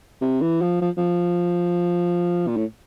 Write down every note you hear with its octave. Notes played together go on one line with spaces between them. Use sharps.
C3
E3
F3
F3
F3
A#2
A2